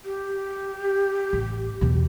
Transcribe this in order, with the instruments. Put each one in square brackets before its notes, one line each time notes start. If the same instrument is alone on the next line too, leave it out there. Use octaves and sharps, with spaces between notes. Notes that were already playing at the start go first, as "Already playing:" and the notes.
[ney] G4
[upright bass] A1
E2 B2